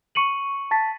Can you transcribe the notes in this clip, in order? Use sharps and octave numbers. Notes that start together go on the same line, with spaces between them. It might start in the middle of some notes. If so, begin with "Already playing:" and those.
C#6 C#7 D#7 F#7
A5 A6 B6